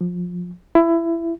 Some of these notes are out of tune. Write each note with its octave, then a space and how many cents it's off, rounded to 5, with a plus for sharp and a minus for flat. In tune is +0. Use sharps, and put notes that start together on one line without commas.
F3 +25
E4 +20